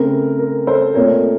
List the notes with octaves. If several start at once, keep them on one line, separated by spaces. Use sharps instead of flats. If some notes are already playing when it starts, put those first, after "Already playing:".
Already playing: C#3 A3 C4 A#4
A#4
A4 C5
A#2 A3 C4 A#4 C#5